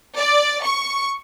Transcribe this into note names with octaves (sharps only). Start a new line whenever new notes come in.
D5
C#6